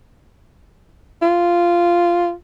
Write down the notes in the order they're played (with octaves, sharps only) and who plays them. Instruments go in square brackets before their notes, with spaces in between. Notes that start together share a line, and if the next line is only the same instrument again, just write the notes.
[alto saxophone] F4